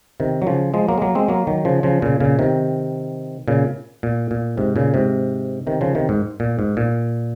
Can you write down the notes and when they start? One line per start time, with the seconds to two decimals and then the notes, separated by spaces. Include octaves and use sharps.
0.20 C3 D#3
0.42 F#3
0.47 C#3 F3
0.74 F3 G#3
0.89 F#3 A#3
0.98 G#3
1.02 F#3 A#3
1.15 G#3 C4
1.28 F#3 A#3
1.47 D#3 F#3
1.65 C#3 F3
1.83 C#3 F3
2.02 A#2 C#3
2.20 A#2 C#3
2.39 C3 D#3
3.48 A#2 C#3
4.03 A#2
4.31 A#2
4.57 G#2 C3
4.76 A#2 C#3
4.94 G#2 C3
5.67 C3 D#3
5.81 C#3 F3
5.95 C3 D#3
6.09 G#2
6.40 A#2
6.59 G#2
6.77 A#2